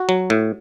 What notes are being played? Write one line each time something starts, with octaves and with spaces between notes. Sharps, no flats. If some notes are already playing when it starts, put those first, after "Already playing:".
Already playing: F#4
F#3
A2